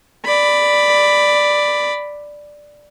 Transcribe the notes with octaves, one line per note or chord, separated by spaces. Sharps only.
D5 B5